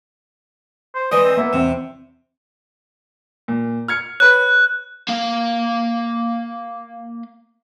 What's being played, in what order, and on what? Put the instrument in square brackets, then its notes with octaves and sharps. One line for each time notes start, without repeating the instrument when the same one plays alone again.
[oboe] C5
[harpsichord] E3 D#5 [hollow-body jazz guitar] D5 [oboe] D#6
[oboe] C4
[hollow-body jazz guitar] A#3 B3 [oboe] E5
[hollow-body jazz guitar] E2 C4 [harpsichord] C3
[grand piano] A#2
F6 G#6 C#7
[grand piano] B4 C#5 [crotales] F#6
[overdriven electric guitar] A#3 F5